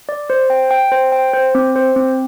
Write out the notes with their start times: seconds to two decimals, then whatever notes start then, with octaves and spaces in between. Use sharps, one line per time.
0.09 D5
0.30 C5
0.50 G5
0.71 G5
0.92 C5
1.12 G5
1.34 C5
1.55 C4
1.76 C5
1.96 C4